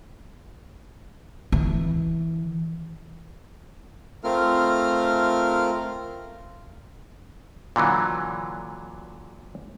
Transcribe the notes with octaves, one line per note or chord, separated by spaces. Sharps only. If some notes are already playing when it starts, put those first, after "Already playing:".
E3
A3 C4 F4 A#4 F6
A#2 D3 E3 F#3